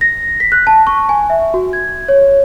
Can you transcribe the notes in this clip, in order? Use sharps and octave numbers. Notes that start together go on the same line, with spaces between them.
A#6
B6
F#6
A5
C#6
G#5
E5
F#4
G#6
C#5